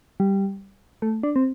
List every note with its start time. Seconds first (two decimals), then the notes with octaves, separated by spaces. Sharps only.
0.20 G3
1.02 A3
1.23 D4
1.36 C4